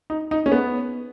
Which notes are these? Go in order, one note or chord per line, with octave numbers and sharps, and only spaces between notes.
D#4
D#4
C#4
B3